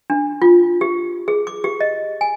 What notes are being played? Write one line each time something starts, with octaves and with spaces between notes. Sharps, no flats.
D4
F4
G4
G#4
D6
G4
D#5
G#5